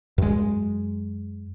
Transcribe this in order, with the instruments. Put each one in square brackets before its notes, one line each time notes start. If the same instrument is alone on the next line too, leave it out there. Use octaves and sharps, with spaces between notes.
[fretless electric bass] F#2 G#3